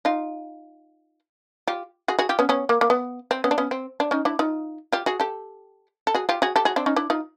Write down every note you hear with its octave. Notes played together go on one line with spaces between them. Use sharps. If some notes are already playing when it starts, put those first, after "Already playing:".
D#4 F4
F4 G4
F#4 G#4
F#4 G#4
F4 G4
B3 C#4
B3 C#4
A#3
A#3
B3
C4
B3 C#4
D4
B3 C#4
C4
D4
C#4 D#4
D4 E4
D#4 F4
F4 G4
F#4 G#4
G4 A4
A4
F#4 G#4
F4 G4
F#4 G#4
G4 A4
F#4 G#4
C4 D4
C#4 D#4
D4 E4
D#4 F4